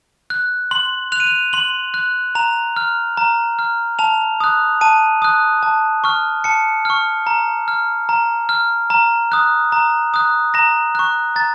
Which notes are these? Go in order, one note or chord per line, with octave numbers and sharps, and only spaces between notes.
F#6
C6 F#7
F#6 F7
D#7
F7
C6 F#7
F#6
A#5 F7
F6
A#5
F6
A5 F7
D#6 F#6
A5 D#7
D#6 F#6
A5
C#6 F6
A5 C#7
C#6 F6
A#5
F6
A#5
F6
A#5
D#6 F#6
A#5
D#6 F#6
A#5 A#6
C#6 F#6
A#5 A6